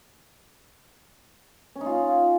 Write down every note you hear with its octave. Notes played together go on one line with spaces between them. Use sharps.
C#4
D#4
F4